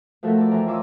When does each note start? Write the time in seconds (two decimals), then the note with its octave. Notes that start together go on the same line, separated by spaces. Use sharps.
0.23 F3 A3 F#4 A4 A#4 E5
0.37 A4 D5
0.51 F2 E3 A#4 G#5 A#5
0.67 F4 C#5 D#5 C6 D6 E6